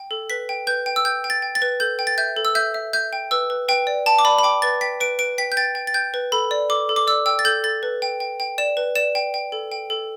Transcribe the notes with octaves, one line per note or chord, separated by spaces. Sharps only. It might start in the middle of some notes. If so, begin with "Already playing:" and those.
Already playing: G5
A4
B4 B6
G5
B4 G6
G5
E6
G5 G6
G5
A6
G5
A6
B4
A4 G6
G5
A6
E5 G6
A4
E6
E5 G6
E5
E5 G6
G5
B4 E6
B4
B4 G5
D5
G5 A5
D6
D5 B5
B5
G5 D6
B4 A6
G5 B6
B4 D7
B4 D7
G5 B6
G6
G5 A6
G5
A6
G5 G6
B4
A4 B5
D5
A4 D6
A4
D6
D5 E6
G5 E6
A6
A4 G6
A4 A6
B4
G5
G5
G5
D5 E7
B4
D5 E7
G5
G5
A4
G5
A4